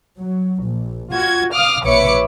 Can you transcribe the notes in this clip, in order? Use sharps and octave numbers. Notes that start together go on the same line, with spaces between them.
F#3
A#1
F4 F#4 G#6
F5 D6 D#6 F6
A#1 B4 C#5 E5 D6 C#7